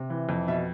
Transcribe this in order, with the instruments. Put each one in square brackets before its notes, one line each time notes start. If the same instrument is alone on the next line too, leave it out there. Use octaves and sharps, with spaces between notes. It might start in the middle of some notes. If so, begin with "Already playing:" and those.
Already playing: [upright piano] C3
E3
F2
B2 E5